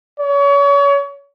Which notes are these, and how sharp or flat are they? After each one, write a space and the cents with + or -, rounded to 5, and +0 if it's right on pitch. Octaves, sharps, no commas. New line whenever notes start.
C#5 +35